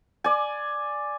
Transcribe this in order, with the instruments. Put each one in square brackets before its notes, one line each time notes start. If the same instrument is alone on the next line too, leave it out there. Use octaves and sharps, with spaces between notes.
[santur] D5 G#5